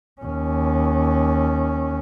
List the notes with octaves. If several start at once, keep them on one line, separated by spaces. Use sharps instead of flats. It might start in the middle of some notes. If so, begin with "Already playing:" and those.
D#2 C#4